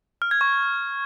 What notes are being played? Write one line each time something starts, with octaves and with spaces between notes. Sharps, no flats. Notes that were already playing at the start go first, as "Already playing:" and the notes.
F6
G#6
C#6